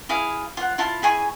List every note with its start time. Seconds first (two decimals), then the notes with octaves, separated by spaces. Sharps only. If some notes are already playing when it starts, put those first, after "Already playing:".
0.09 E4 G#4 F5
0.57 F4 F#5
0.78 E4 F4 A5
1.02 E4 G#4 G#5 C#6